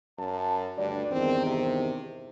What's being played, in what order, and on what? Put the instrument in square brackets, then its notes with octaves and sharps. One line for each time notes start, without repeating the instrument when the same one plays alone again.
[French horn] F#2 [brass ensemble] A5
[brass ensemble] D2 D4 D5 [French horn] G2
[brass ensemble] E2 G2 D#3 [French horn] C4
[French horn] C3